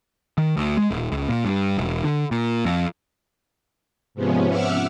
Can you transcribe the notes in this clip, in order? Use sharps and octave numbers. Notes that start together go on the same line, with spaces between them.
D#3
D2
G#3
D#1
C#2
A#2
G2
E1
D3
A#2
F2
G#2 C3 F3 B3 C#4
E5 F#5 D6 E6 F6